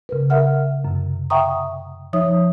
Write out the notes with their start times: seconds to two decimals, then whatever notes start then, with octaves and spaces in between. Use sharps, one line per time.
0.09 C#3 A#4 B4
0.30 A#4 E5 F#5 F6
0.85 F#2 C3
1.30 E5 F#5 G5 A#5 C#6 D#6
2.13 F3 D#4 C#5 E5 D#6